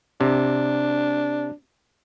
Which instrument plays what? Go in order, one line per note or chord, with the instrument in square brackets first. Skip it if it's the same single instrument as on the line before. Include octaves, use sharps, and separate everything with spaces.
[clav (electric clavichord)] C3 [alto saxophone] D4